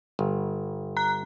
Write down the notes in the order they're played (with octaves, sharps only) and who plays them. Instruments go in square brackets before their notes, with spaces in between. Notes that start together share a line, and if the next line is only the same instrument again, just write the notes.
[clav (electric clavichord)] G1
[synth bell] A#5 F#6